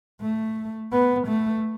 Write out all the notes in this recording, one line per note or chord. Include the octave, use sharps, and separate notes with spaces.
A3
B3
A3